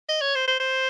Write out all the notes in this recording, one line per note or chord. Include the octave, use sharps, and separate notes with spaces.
D#5
C#5
C5
C5
C5